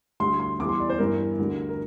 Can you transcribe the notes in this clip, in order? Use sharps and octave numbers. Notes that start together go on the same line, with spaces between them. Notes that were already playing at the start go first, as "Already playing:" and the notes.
D2 D3 G3 C6
C6
E2 E3 G3 D6
C6
D5
C5
G1 G2 E3 A#4
D2 D3 G3
A#4